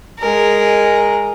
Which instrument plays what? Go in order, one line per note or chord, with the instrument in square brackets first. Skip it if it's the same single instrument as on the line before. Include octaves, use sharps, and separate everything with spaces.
[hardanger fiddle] G#3 A#4